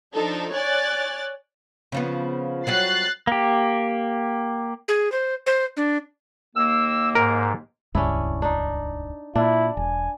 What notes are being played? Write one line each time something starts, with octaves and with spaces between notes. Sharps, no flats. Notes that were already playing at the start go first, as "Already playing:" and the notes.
F3 D4 D#4 A4
C#5 D5 G#5 F#6 A6
C#3 F3 B3
F#3 G3 F#4 F#6 A6 C7
A#3 G4
G#4
C5
C5
D4
D#2 A#3 E6
G#2 A#4
D#1 C#2 G2 C#4 D4 E4
D4 D#4
A#2 D4 E4
E1 G#5